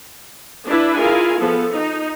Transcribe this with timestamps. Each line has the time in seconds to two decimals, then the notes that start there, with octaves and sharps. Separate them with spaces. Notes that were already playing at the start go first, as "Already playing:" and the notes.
0.67 D4 E4 B4
0.98 E4 F4 G#4 A#4 F5 G#5
1.38 F3 B3 A4
1.71 D#4